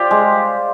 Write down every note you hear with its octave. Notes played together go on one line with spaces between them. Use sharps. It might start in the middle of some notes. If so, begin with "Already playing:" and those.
Already playing: F4 G4 C5 D5 F5
G#3